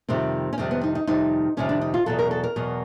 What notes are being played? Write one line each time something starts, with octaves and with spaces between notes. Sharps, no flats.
F2 C3 D#3 G3 C4
C#4
F2 C3 D#3 G3 C4
B3
D#4
D#4
F2 C3 D#3 G3 D#4
F2 C3 D#3 G3 C#4
D4
D#4
F4
E2 B2 F#3 A4
A#4
A4
A#4
E2 B2 F#3